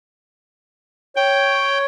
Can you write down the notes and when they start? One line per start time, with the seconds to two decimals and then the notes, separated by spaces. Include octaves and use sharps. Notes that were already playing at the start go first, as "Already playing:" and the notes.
1.16 C#5 G5